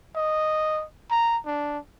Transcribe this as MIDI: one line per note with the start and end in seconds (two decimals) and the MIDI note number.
0.16 0.84 75
1.11 1.38 82
1.45 1.78 62